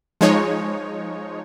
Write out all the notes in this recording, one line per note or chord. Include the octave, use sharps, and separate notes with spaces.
F3 G#3 D#4 C#5